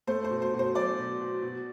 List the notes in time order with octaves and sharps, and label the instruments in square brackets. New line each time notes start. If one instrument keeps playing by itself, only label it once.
[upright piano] A3 C5
C5
B2
C5
B2
C5
F#3 D5
B2
B2
B2